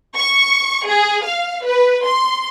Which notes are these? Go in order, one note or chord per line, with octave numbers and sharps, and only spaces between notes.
C#6
G#4
F5
B4
C6